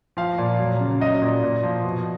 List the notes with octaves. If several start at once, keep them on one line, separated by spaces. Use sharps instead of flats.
F3 F5
A#2
F#3
C#3
F#3 D#5
A#2
A#2
F3
B2